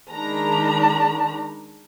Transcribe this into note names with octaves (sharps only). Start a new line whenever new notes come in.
D#3 G#3 D4 A#5 B5